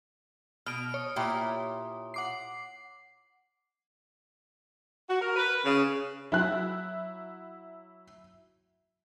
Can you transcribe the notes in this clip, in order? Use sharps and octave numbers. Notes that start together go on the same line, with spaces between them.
B2 F6 D7
C#5 D#6
A#2 E4 G4
F#5 D6 C7
F#4
A#4
B4
C#3
F#3 E4 F#6